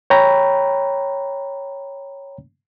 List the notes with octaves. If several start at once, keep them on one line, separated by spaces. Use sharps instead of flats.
C#5 G5 A#5 B5